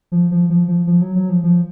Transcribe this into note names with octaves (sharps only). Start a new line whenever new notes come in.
F3
F3
F3
F3
F3
F#3
F#3
F3
F3